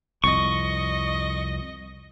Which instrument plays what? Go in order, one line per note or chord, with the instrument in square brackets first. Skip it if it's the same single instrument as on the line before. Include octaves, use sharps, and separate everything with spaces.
[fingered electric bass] C2 F2 [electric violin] D#5 [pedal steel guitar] C#6